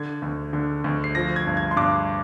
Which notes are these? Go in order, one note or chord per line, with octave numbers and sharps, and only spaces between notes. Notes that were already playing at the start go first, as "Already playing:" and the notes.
Already playing: D3 G#6
D2
D3
D2
C7
F3 A#6
G#6
G2
G#6
C6
G2 D6